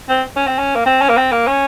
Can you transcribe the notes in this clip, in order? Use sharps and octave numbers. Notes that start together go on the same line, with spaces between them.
C4
C#4
C4
C#4
A#3
C4
C#4
A#3
C4
A#3
C#4